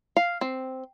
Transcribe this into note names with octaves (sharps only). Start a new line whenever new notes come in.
F5
C4